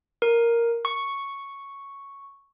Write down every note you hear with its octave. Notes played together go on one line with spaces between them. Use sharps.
A#4
C#6